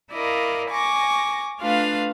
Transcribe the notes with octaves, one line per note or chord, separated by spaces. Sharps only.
E4 A#4 D5 D#5 F5
G#5 C#6 D6 A#6
A3 D4 F4 B4 F5